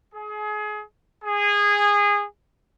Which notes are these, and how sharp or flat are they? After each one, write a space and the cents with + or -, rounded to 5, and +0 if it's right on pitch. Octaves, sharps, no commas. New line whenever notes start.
G#4 +30
G#4 -20